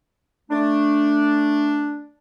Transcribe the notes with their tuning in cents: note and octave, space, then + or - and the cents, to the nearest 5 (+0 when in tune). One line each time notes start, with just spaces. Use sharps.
A3 +0 D4 +0